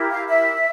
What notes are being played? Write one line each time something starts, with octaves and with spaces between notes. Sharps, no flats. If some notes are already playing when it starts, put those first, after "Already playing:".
Already playing: E4 G4 A#4
F5
E5